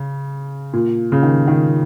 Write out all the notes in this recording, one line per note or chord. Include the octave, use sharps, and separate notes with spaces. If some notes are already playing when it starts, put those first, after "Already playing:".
Already playing: C#3
A#2
C#3
D#3
D#3